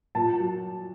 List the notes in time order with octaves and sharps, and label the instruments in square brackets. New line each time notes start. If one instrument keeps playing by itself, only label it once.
[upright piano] A#2 A5
F#3